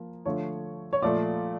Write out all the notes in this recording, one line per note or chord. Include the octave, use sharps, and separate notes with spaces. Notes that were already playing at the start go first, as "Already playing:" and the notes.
Already playing: F3 A#3
D3 F3 A3 C#5
C#5
A#2 F3 A3 D5